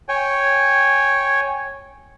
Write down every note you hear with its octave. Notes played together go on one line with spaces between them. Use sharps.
C#5 G5 G#5